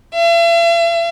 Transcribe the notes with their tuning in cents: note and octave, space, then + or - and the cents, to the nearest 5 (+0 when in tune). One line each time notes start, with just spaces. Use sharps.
E5 +45